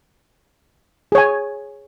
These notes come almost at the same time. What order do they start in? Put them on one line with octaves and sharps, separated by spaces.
G#4 C#5 G#5